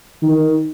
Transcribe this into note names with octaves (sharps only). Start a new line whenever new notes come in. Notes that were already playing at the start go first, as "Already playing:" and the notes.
D#3